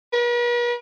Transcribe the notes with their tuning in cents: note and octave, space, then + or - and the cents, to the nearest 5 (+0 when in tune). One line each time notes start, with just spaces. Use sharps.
B4 -45